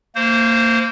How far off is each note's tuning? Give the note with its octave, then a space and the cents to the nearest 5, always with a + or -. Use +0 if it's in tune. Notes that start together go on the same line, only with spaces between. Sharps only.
A#3 -25 C5 +0